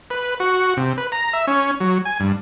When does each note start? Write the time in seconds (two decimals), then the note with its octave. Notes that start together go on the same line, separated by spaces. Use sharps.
0.10 B4
0.40 F#4
0.77 C3
0.98 B4
1.12 A#5
1.33 E5
1.47 C#4
1.80 F#3
2.05 G#5
2.20 G2